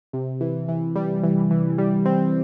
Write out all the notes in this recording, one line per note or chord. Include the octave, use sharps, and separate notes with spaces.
C3
E3
E3
G3
E3
E3
G3
C4